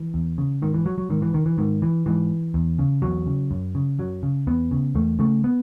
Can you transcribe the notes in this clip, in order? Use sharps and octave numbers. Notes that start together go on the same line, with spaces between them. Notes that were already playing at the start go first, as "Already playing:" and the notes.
Already playing: E3
E2
C#3
G#2 D#3
E3
F#3
F#3
G#2 D#3
E3
D#3
E3
G#2 D#3
E3
G#2 E3
E2
C#3
E2 F#3
C#3
F#2
C#3
F#2 F#3
C#3
E2 B3
C#3
E2 A3
C#3 A3
B3